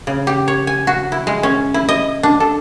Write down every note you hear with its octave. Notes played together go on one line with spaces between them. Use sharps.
C#3
G4
C#5
G#5
F#4
E4
G#3
C#4
E4
D#5
D4
A4